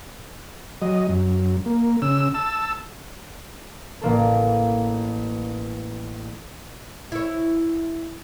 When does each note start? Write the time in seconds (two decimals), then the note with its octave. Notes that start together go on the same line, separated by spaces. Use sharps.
0.82 F#3 D#5
1.09 F#2
1.66 A#3
2.02 C#3 E6
2.34 A5 E6
4.01 A1 A#3 A4
7.12 E4 C#5